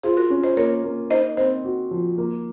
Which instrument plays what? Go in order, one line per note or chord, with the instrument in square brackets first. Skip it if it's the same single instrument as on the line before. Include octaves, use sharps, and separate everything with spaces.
[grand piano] F4 [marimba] G#4 C5
[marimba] F#4 A#4
[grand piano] C#4
[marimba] C5 D#5
[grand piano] A#3 [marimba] A#4 C#5
[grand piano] A#3
[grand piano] D#4 [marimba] C5 D#5
[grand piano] C4 [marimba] C5 D#5
[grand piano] F#4
F3
A#3